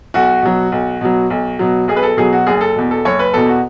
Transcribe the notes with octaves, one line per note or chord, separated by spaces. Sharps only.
B1 F#4
B2 F#3
B1
B2 F#3
B1
B2 F#3
B1 G#4
B4
A4
B2 F#3 G#4
F#4
F#1 G#4
A4
E2 B2
A4
F#1 C#5
B4
E2 B2 A4
F#4